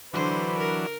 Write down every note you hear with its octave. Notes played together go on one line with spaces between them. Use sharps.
D3 E3 F#3 D4 B4 C5
A#4